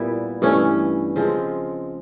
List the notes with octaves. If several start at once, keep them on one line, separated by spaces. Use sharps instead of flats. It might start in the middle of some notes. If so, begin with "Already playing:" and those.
Already playing: A#2 G3 B3 E4
G2 E3 A3 C#4
C#3 F3 G#3 C4